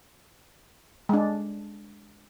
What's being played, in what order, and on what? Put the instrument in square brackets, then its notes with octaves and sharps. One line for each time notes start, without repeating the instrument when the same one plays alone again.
[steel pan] G#3 D4